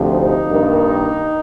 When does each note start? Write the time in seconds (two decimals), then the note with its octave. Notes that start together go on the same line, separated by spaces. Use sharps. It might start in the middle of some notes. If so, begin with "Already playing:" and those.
Already playing: D2 C3 F3
0.14 D#4
0.50 G2 D#3 A#3